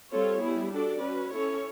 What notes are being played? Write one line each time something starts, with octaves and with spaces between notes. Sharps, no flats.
G3 C4 F4 A4 C#5
G3 B3 E4 G#4
D4 F#4 A4 D5
C#4 F#4 B4
C#4 E4 A4 C#5